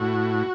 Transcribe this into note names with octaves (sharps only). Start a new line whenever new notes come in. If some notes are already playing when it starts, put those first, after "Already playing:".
Already playing: A2 F#4